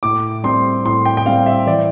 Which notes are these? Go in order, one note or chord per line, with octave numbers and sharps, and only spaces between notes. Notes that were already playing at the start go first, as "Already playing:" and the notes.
A2 D6
G3 C4 C6
A2 C6
G5
G5
G3 C4 F5
E5
E3 D5